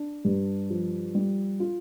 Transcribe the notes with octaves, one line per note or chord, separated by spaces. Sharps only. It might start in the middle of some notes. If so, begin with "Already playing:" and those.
Already playing: D4
G2
F3
G3
F4